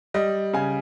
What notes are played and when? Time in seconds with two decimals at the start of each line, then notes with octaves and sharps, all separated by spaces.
0.14 G3 D#5
0.53 C#3 G#5